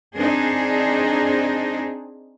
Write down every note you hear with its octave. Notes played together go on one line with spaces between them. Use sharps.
C4 D4 D#4 G#4